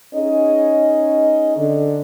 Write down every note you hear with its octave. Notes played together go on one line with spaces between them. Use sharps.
C#4 D#4 G#4 D#5
D3